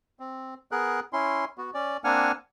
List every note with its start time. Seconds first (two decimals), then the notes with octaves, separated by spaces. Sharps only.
0.20 C4
0.72 B3 G#4 A#4 F#6
1.13 C#4 E4 C6
1.58 B3 F#4
1.74 C#4 D5
2.04 A#3 C4 D4 F#5 G#5 F6